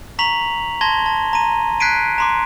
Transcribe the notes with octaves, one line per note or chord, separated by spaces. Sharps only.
A#5 C#6 B6 F7 F#7
A5 C6 G#6 A#6 G7
A5
A#5 D#7
F#6 G#6 B6 C7 D7 D#7
A#5 C6 D6